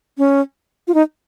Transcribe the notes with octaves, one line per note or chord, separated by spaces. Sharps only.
C#4
F4
D#4